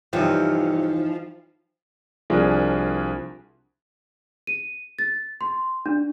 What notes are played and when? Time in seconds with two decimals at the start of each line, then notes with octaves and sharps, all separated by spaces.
0.13 G2 C3 E3 F3 D#4 C#5 G5
2.30 C2 F3 D4 G#4 A#4
4.47 D#7
4.99 A6
5.41 C6
5.86 D4